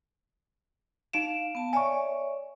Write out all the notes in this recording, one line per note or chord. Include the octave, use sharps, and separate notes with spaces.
D#4 F5 D7 E7
B3 A5
C#5 D5 E5 G#5 C#6